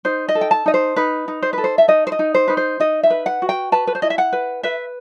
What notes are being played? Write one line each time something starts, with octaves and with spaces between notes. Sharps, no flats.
D#4 C5
D#5
A4
G5
A5
D#4 D#5
C5
D#4 B4
D#4
C5
A4 B4
C5
E5
D#4 D#5
C5
D#5
D#4
C5
D#4 B4
C5
D#4 D#5
E5
B4
F#5
F#4
G5
B4 A5
B4
C5
E4 D#5
E5
F#5
B4
B4 E5